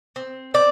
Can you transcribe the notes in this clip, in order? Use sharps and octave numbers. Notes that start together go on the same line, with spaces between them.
C4
C4 D5